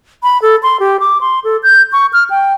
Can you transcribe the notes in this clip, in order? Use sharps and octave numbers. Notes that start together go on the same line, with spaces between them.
B5
A4
C6
G4
D6
C6
A4
G6
C#6
F6
G5